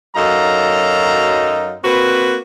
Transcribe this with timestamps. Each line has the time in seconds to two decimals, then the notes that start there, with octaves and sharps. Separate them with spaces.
0.16 F#2 F#3 D#4 A4 F5 A#5
1.84 A#3 C4 F#4 B4